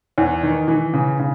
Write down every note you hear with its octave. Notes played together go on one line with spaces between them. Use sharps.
E2
D#3
E3
C#3
C#3